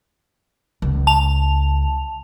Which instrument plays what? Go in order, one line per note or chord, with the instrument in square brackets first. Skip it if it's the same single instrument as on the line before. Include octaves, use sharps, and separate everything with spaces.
[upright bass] C#2
[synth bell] A5 F7